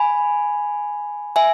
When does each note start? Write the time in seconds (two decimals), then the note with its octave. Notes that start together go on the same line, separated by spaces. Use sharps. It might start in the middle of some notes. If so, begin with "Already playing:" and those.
Already playing: G#5 B5
1.36 E5 G#5